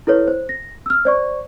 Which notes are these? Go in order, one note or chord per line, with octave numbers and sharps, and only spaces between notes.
E4 A4 B4 C#5
C5
A#6
E6 F6
C5 D5 C#6